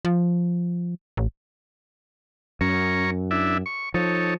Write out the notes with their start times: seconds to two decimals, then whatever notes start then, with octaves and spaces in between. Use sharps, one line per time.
0.05 F3
1.17 A1
2.61 F#2 C#4 A#5 C#6
3.31 D4 E4 E5
3.66 C#6
3.94 F3 D#4 A4 C#5